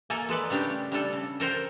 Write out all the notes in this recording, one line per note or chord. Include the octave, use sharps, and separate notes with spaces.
A#3 A4 G#5
G#3 A4 B4 D5
C#3 G3 A3 D4 G4
G3 D4 A4
C#3
A4 A#4 C5 G5